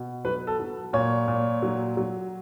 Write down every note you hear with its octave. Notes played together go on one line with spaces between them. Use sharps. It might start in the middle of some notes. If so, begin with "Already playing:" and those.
Already playing: B2
F#3 B4
A4
F#3
A#2 C#5
A#2
F#3
F#3